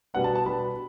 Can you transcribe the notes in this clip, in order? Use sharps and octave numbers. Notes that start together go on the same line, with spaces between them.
B2 G3 B3 D4 F#5
A5
A5
B2 G3 B3 D4 B5